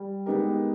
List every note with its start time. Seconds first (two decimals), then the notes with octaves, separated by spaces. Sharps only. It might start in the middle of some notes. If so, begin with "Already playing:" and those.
Already playing: G3
0.26 G#3 B3 D#4 G4 A#4